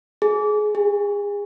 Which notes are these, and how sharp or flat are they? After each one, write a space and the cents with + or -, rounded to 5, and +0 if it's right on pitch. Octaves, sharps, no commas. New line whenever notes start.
G#4 +25
G#4 -30